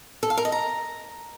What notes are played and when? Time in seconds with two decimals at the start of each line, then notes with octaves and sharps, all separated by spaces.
0.23 A4
0.30 F5
0.37 A#4
0.45 D#5
0.52 A#5